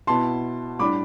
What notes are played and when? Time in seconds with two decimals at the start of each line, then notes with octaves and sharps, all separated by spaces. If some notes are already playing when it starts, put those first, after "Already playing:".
0.07 B2 B3 E4 A5 C6
0.79 A2 G3 D4 B5 D6